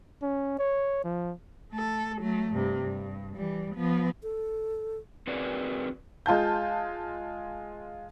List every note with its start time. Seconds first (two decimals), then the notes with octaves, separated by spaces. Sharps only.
0.22 C#4
0.59 C#5
1.04 F3
1.71 A3 A4
2.20 F#3 A3
2.51 G2 C3
2.82 G2
3.36 E3 G3
3.74 F3 B3
4.23 A4
5.27 C4 F#4 G#4 A#4 B4 D5
6.26 G#3 F4 A5 G6